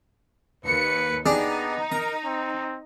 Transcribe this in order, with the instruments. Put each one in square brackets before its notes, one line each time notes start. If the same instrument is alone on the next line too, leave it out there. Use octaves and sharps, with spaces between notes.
[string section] D#2 C#7 [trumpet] B4
[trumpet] B3 [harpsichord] D4 G4 G#4 [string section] D#4
[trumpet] A#4 [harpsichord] A#5
[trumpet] C4